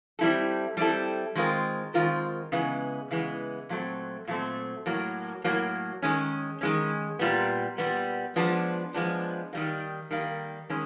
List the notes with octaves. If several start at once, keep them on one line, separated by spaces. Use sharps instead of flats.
G3 C4 E4 A4
G3 C4 E4 A4
D#3 G#3 C4 F4 A#4
D#3 G#3 C4 F4 A#4
C#3 E3 G#3 B3
C#3 E3 G#3 B3
A#2 F#3 A3 C4
A#2 F#3 A3 C4
A2 F#3 A#3
A2 F#3 A#3
D#3 G#3 C#4
D#3 G#3 C#4
A#2 G3 B3
A#2 G3 B3
F3 G#3 B3 D4
F3 G#3 B3 D4
D#3 G3 A#3
D#3 G3 A#3
D#3 G#3 C#4